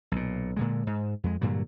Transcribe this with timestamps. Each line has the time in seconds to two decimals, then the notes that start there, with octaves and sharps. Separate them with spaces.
0.12 B1 A#2
0.56 A#2 D3 G#3
0.87 G#2
1.24 F2 G#3
1.41 G2 A#2 D3 F#3